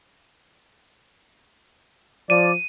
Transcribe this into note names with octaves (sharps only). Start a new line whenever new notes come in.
F3 D5 D#7